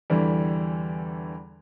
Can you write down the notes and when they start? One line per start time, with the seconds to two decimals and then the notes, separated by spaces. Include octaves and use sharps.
0.10 E2 D3 E3 G3